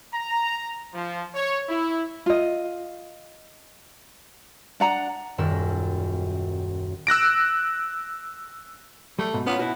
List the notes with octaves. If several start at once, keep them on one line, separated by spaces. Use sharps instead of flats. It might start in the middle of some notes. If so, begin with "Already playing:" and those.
A#5
F3
C#5
E4
F4 D#5
D4 F#5 A#5
D#1 F#2 G3 A#4 E6 A#6
E6 F#6 A#6 D7
G3 A3
G#2 B2
B3 C#4 F4
B2 E4 F#4